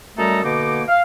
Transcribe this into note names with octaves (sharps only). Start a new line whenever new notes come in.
F#2 G3 A3 A4 D#5 A#5
B2 D3 A#3 D#4 D6
F5